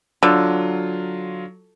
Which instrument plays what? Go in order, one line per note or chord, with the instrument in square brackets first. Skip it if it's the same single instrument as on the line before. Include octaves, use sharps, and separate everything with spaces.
[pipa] D3 [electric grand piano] F#3 F4